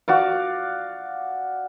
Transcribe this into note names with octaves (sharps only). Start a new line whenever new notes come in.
F#4 D5 F5